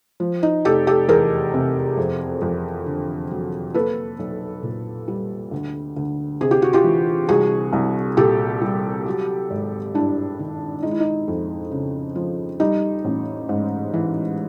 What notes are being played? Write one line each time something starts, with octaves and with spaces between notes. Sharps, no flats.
F3
D#4
F1 G4 A4
G4 A4
E2 G#4 A#4
C3
F2
F2
D3
F#3
A#3 A4 B4
B1
A#2
G3
D2
D2
C3 G#4
G4
F#4
F4 G4
E3
C2 F#4 G#4
C2
A#2 G4 A4
G3
F#3
G#1
G2 D4 E4
D#3
G#3 D#4
E4
D#4
F2
C#3
F3
G3 D#4
A1
G#2
E3